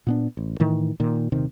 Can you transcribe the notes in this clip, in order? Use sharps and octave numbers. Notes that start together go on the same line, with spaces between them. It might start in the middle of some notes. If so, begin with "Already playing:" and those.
A#2 B3 D4
A1
A2 D#3 E3
A#2 D#3
D#1 C3 D#3